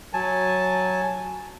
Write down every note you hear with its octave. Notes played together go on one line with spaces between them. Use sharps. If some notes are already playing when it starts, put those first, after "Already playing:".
F#3 G#5 A5